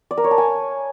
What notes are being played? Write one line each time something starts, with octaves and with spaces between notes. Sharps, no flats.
D5
A#4
C#5
A5
G#5